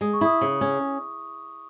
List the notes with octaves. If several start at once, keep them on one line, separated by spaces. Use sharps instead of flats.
G#3 D#6
C#6
E4 D#6
C#3
C#4